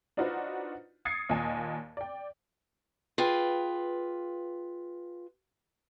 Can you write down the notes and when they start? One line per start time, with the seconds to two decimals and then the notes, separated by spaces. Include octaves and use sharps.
0.17 D4 D#4 F4 F#4 B4 C5
1.05 D#6 G#6 A6 C7 C#7
1.29 D#2 A#2 D#5 G#5 A5 D#6
1.97 D5 G5
3.18 F4 G#4 B4 G5